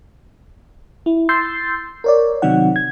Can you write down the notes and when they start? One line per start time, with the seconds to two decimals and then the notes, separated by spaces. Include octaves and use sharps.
1.06 E4
1.29 C6 E6 G6 A6 C7
2.04 A#4 C#5 D5
2.42 C3 D#3 F#3 C4 D#4 F#5
2.76 G#6